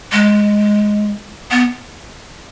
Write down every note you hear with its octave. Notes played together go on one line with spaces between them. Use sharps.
G#3
B3